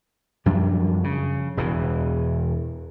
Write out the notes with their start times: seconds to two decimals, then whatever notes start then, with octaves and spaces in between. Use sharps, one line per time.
0.46 F#2 F3 G3 D4
1.04 C#3
1.57 E1 E2 E3